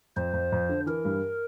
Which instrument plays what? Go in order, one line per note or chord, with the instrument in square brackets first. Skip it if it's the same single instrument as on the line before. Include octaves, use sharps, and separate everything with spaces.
[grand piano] F2 [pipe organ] C5
[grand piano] F2
F2
D3
[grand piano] E3 [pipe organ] A#4
[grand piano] G2